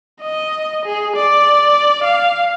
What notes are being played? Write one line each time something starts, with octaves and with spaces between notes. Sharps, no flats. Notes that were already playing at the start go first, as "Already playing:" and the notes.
D#5
G#4
D5
F5